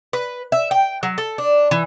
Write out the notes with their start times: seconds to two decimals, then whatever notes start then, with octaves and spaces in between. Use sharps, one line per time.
0.13 B4
0.52 E5
0.71 G5
1.03 F#3
1.18 A4
1.38 D4
1.71 E3